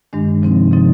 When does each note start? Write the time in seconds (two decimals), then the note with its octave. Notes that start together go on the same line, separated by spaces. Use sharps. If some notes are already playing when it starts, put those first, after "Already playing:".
0.13 G2 D#3 G#3 D4
0.42 C3 F3 C4 D#4
0.72 C3 F3 C4 D#4